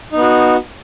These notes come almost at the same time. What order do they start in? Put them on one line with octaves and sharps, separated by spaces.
D#4 B3 F#4